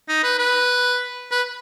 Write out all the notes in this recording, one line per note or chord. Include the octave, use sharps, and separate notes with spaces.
D#4
B4
B4
B4